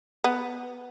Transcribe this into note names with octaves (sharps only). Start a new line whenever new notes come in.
B3